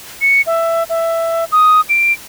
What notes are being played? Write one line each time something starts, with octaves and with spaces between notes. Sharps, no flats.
C#7
E5
E5
D#6
D7